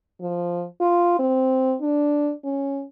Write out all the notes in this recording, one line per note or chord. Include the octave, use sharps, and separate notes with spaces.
F3
F4
C4
D4
C#4